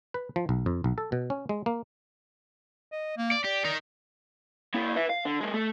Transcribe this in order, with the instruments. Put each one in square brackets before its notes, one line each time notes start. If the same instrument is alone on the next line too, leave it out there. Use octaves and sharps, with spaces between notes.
[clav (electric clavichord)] B4
F3
B1
F2
B1
A4
B2
C#4
G#3
A#3
[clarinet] D#5
A#3
[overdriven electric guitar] D5
[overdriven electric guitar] G4 [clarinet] D5
[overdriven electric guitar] D#4 A#4
A#3 E4
B4 E5
F5
D3
G#3 A#3
A3